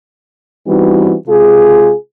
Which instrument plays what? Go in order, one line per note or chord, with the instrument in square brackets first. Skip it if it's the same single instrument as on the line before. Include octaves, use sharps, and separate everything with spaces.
[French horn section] E3 G3 B3 C4 D#4 F#4
C3 G#3 F4 G#4